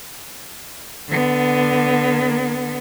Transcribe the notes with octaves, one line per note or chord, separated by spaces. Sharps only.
D3 B3